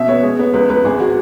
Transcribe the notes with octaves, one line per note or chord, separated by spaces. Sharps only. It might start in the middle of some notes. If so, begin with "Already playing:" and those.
Already playing: B2 E5
B3 C#5
G#3
B3
C#2 B4
C#2 B4
G#1 G#4
F#4